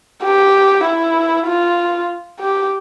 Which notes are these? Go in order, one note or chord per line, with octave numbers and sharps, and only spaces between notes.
G4
E4
F4
G4